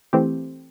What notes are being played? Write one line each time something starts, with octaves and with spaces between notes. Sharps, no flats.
E3 A3 C4 G4